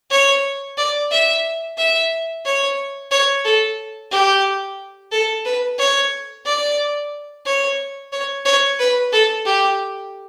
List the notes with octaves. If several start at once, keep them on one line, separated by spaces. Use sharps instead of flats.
C#5
D5
E5
E5
C#5
C#5
A4
G4
A4
B4
C#5
D5
C#5
C#5
C#5
B4
A4
G4